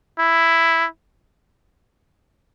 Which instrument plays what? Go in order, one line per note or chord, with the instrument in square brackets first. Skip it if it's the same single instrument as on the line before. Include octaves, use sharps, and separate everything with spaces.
[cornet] E4